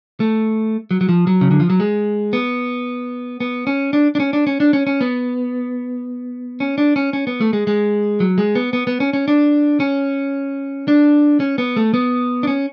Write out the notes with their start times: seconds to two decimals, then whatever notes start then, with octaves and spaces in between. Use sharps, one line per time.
0.20 A3
0.91 F#3
1.01 F#3
1.09 F3
1.27 F#3
1.41 C#3
1.51 D3
1.60 F3
1.70 F#3
1.80 G#3
2.33 B3
3.40 B3
3.67 C#4
3.93 D4
4.15 D4
4.20 C#4
4.33 D4
4.47 C#4
4.60 D4
4.73 C#4
4.87 C#4
5.01 B3
6.60 C#4
6.78 D4
6.96 C#4
7.13 C#4
7.27 B3
7.41 A3
7.53 G#3
7.67 G#3
8.20 F#3
8.38 G#3
8.55 B3
8.73 B3
8.87 B3
9.00 C#4
9.13 C#4
9.28 D4
9.80 C#4
10.88 D4
11.40 C#4
11.58 B3
11.76 A3
11.94 B3
12.43 D4
12.47 C#4